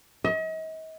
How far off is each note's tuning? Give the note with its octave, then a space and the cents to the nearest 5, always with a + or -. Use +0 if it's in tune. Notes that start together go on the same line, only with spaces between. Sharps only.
D#5 +40